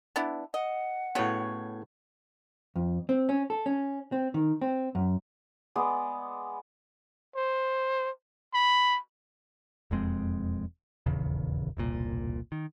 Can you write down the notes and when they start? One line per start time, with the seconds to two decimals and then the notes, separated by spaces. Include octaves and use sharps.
0.16 B3 D4 E4
0.54 D#5 F#5
1.15 A2 C#3 B3 F#4 C#5
2.76 F2
3.09 C4
3.29 C#4
3.50 A4
3.66 C#4
4.12 C4
4.34 D#3
4.61 C4
4.95 F#2
5.76 G#3 B3 D5
7.36 C5
8.54 B5
9.91 E1 F2 G#3 C4
11.06 D#1 A#1 E2 C#3
11.77 E1 C2 A#2
12.52 D#3